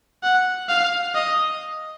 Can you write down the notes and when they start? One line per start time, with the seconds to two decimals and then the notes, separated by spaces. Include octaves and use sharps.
0.23 F#5
0.69 F5
1.15 D#5